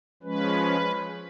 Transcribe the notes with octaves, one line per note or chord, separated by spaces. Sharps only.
F3 G#3 C#4 B4